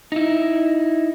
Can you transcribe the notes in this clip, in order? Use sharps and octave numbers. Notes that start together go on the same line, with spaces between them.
D#4 E4